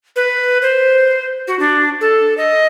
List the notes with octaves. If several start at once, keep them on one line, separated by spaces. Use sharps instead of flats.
B4
C5
F#4
D4
A4
D#5